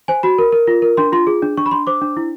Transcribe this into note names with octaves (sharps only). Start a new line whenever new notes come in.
C5 G#5
F#4 B5
A#4
A#4
F4
A#4
D4 C6
F4 C6
G#4
D4
D4 C#6
B5
D4 C6
C5 D6
D4
E4